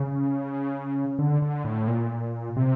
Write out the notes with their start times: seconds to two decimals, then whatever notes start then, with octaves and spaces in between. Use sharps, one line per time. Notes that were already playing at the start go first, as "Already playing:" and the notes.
Already playing: C#3
1.19 D3
1.42 D3
1.64 A2
1.88 A#2
2.57 C3